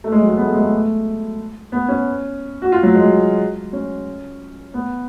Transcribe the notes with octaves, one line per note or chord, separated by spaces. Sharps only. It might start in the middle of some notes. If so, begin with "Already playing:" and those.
A3
G#3
F#3
G#3
B3
A3
G#3
A3
B3
C#4
F#4
F4
F#3
G#3
C#4
B3